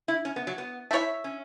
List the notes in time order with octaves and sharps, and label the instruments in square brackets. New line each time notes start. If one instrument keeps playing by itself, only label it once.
[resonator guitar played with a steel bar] E4
C#4
B3
F#3
B3
[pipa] A3 E4 C#5 E5
[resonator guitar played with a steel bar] C#4